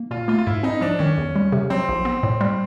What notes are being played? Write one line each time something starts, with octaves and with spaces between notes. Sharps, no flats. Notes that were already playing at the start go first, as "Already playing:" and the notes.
Already playing: A#3
A#2 F4
A3 F4
F4
G#2 E4
C4 D#4
F3 D4
D#3 C#4
E2
G3
C3
F#3 C4
A#1
B3
A2
G3